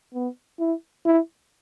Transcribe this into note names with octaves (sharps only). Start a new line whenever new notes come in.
B3
E4
E4